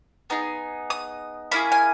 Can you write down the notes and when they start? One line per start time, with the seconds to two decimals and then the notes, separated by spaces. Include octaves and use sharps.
0.30 B3 D#4 G#4
0.90 D#6
1.52 A#3 C#4 E4 G#4 B5
1.72 G#5